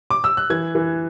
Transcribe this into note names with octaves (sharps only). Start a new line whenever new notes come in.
D6
E6
F#6
E3 G#6
E3